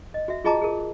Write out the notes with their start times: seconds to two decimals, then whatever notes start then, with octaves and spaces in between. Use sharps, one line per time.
0.14 D#5
0.28 F#4 E5
0.44 F4 G#4 D#5 A5 A#5 D6
0.61 G#4 A#4